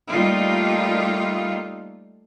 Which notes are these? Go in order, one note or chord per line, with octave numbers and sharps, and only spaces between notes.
G3 A3 A#3 D#4 F4